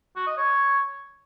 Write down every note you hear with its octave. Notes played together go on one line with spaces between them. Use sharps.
F#4
D#5
C#5